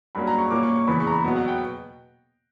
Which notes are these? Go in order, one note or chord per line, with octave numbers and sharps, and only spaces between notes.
G2 F#3 A#3 C#4 B5
A#5
C#6
A#2 A#3 C#4 D6
C#6
C#6
E2 C#3 E3 B5
C#6
A#5
B5
B2 F#3 B3
F#5
G5